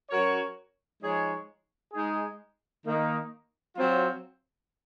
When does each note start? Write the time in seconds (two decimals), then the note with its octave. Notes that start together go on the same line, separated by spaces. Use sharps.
0.10 F#3 C#4 F#4 A#4 C#5
1.02 F3 G#3 D#4 G#4 C#5
1.93 G#3 D#4 G#4
2.85 D#3 A#3 D#4
3.77 F#3 C4 F4